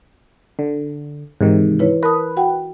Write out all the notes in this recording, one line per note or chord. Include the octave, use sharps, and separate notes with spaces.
D3
G#2 C3 D#3 E3
E4 B4 C#5
A#4 B4 A5 D#6
F#4 F#5 G5